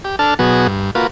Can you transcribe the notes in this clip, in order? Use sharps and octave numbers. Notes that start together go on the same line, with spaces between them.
G4
D4 A4 A5 F6
B2 F#3 B3 F#4 G#4
G2
A#3 F4 F#4 B4